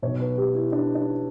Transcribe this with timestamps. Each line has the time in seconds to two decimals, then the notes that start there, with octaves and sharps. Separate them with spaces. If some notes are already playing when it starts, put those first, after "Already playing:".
0.02 B1 B2 C#5
0.20 B4
0.38 G4
0.54 E4
0.72 D4
0.95 D4